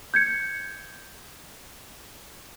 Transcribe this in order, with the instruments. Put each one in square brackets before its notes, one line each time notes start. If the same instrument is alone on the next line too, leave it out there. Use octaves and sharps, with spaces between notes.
[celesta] G6 G#6 C#7